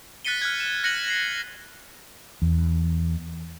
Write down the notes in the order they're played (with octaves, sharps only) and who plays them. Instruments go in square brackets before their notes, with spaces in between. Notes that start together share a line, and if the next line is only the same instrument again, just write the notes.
[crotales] F#6 A6 B6 C#7 D#7 G7
F6 F#6 G#6
E7
F#6 A#6 C#7 D#7 F#7
C7 F#7
[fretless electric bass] E2